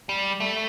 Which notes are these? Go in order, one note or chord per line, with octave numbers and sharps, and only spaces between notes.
G3
A3